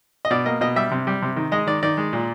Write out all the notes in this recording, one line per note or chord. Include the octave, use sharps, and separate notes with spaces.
D#5
B2 D5
A#3 D#5
B2 D#5
G3 E5
C3
G3
C3
D#3
G#3 D#5
D#3 D5
D#3 D5
G#3
A#2